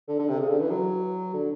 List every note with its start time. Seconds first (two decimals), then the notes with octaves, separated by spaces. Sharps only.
0.08 D3
0.19 D3
0.29 C3
0.40 C#3
0.50 D3
0.60 E3
0.71 F#3
1.34 D3